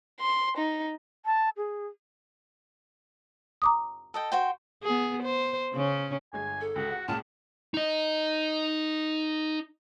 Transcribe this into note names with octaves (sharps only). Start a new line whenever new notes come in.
C6
D#4
A5
G#4
A#5 D6 D#6
A4 D#5 G5
F#4 C5 G5
B3 G#4
C5
C#3 C#4
G1 G#3 G#5 G#6
A4
C#2 F#4
F#5
C#2 A#2 C#3 F4 A5
D#4 D#5